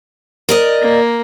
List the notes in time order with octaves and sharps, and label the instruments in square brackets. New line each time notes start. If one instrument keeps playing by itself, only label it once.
[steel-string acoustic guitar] A#4 D5 D#5
[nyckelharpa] A#3